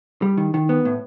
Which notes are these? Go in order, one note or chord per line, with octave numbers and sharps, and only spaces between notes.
G3
D#3
D#3
B3
A2